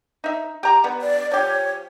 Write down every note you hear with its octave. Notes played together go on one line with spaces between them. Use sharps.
D#4 E5
G4 A#5
G3 B3
D5
F3 G4 C#5